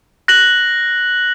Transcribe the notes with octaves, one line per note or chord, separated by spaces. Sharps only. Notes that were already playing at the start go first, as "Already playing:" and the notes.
F#6 A#6 F#7